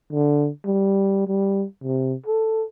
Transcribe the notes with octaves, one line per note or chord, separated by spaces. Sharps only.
D3
G3
G3
C3
A4